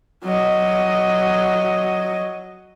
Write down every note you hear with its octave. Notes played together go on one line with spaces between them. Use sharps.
F#3 D#5